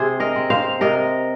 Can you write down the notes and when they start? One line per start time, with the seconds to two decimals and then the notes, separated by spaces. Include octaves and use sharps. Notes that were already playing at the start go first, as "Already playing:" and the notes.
Already playing: C3 G#4 C5
0.20 A#4 D#5
0.36 C4
0.50 C5 F5
0.81 C3 A#4 D#5